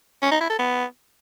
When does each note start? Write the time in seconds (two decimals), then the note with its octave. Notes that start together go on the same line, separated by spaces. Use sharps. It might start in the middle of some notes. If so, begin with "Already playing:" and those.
0.22 C#4
0.31 D#4
0.40 E4
0.50 A4
0.59 B3